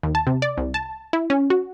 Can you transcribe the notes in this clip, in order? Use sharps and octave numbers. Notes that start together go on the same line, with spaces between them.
D#2
A5
C3
D5
C2
A5
E4
C#4
F#4